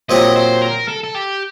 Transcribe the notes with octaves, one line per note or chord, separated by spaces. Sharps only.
A#2 F#3 C4 G4 D#5
C5
A#4
A4
A4
G4